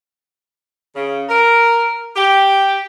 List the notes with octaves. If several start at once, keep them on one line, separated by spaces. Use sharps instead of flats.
C#3
A#4
G4